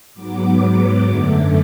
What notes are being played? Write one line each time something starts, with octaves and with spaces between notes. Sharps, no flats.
G#2 F#3 B3 D6
F#2 D3 A3